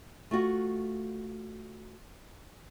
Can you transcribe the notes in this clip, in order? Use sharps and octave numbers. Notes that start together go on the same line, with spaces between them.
A3 F4 F#4